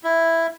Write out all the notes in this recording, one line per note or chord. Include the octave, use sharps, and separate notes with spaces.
E4